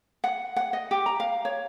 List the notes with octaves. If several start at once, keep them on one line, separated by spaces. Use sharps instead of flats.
F#5
F#5
D#5
G4
A#5
F5
C#5